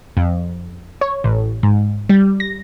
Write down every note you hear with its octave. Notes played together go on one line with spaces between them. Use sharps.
F2
C#5
A1
G#2
G3
A#6